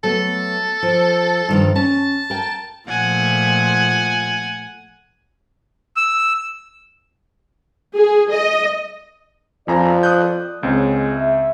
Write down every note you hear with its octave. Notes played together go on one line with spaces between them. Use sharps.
F#3 A3 B3 A4
F3
G2 D#3 F3
C#4 A5
A#4 G5
A#2 F3 A3 F#5 G#5
E6
G#4
D#5
F2 F3 D5 G#5 A#5
D#6 F#6 G6
C#2 G#3 C4 G#4 C#5
E5